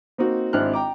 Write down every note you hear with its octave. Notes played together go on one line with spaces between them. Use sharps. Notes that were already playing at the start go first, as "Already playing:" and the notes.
A#3 C4 D#4 F#4
G#1 C4 D4 E4 F6 F#6
G5 A#5 D6